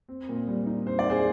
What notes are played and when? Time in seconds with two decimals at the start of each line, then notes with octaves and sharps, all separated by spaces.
0.09 C4
0.29 A#2
0.47 G3
0.66 D#4
0.87 C4 C5
0.99 D5
1.06 A#2 G#4 C5